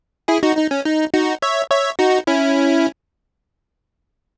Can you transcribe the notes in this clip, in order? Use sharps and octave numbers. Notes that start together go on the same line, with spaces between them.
E4 G#4
D#4 F#4
D#4
C#4
D#4
D#4 F#4
C#5 E5
C#5 E5
D#4 F#4
C#4 E4